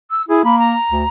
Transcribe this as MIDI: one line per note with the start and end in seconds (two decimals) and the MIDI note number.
0.11 0.22 88
0.28 0.43 64
0.28 0.42 68
0.44 0.74 58
0.44 0.56 83
0.59 1.09 82
0.91 1.04 38